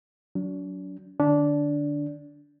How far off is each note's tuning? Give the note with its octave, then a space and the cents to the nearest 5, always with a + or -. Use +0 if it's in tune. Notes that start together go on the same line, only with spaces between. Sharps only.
F#3 +0 D4 -40
D3 +30 D4 -15